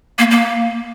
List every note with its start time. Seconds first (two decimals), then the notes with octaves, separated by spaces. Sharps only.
0.19 A#3
0.31 A#3